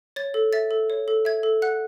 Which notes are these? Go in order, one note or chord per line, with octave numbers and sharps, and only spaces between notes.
C#5 A6
A4
E5 A6
A4
C#5
A4
E5 G#6
A4
F#5 F#6